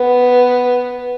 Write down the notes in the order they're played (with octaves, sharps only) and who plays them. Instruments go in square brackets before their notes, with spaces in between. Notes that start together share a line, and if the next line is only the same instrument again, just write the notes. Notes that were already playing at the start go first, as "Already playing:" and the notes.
Already playing: [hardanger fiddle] B3